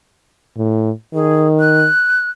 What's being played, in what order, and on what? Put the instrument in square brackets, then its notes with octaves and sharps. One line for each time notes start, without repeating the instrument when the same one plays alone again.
[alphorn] A2
[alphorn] D#3 [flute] G#4
[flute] F#6